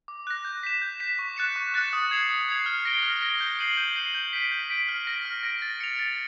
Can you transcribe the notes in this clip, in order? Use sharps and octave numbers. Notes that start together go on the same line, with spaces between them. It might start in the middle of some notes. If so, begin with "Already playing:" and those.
D6
F#6 A#6
G6
B6 E7
G6
B6 E7
C#6
F#6 A6 C#7 E7
C#6
F#6 A6 C#7 E7
D#6
G#6 C7 F7
D#6
G#6 C7 F7
F6
A#6 D7 G7
F6
A#6 D7 G7
G6
C7 D#7 F#7
G6
C7 D#7 F#7
G6
B6 D7
G6
B6 D7
F6
A#6 D7
F6
A#6 D7
A6
C#7 F7
A6